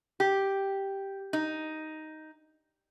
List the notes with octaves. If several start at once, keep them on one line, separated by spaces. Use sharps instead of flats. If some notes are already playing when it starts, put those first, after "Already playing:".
G4
D#4